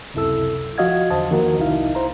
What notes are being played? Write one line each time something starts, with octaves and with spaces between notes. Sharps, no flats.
C#2 F#2 C3 E4 A4 E6
F3 F#4 D#5 F5 G#6
E2 D3 C5 D#5 A5
D#3 F3 A#3 D#4 F#4 A#4
C2 D#4 E4 F5
E4 C5 A#5